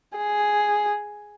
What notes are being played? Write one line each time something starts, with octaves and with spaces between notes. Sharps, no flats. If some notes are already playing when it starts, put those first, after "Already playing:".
G#4